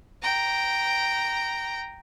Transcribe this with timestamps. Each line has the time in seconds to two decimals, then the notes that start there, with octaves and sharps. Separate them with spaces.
0.22 G5 A#5